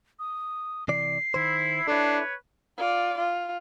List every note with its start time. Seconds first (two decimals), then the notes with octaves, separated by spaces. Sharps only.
0.19 D#6
0.88 C3 E3 D5 C7
1.34 D#3 E4 C5
1.88 D4 E4 A4 B4 C#5
2.77 F4 D5
3.18 F4